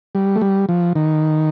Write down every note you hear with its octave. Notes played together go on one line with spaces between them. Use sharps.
G3
A3
G3
F3
D#3